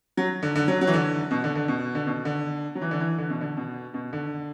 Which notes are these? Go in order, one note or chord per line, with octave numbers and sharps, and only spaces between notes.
F#3
D3
D3
F#3
F#3
E3
D3
B2
D3
D3
B2
D3
B2
D3
F#3
E3
D3
E3
D3
B2
D3
B2
B2
D3